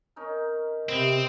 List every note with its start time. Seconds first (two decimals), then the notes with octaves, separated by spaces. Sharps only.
0.16 C#4 D#4 A#4
0.89 C3 B3 C4